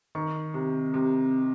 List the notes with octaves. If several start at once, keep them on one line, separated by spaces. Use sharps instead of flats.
D#3 C#6
C3
C3